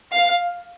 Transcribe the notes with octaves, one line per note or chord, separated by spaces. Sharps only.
F5